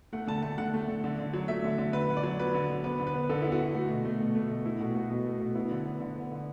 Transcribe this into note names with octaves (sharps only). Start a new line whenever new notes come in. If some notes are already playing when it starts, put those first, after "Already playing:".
A3 F#5
D3 A5
A3 A5
D3 F#5
A3
D3
D3
D3
F#3
A3 E5
D3
D3
D3 B4
D3
D5
F#3
B3 B4
D3
D3
B3 B4
D3
B4
B3
D3 A4
B3 E4
F#4
D3
A3 F#4
B2
A3
B2
A3
B2
A3 E4
B2 F#4
A3 F#4
B2
A3
B2
B3 E4
D3
B3
D3
B3
D3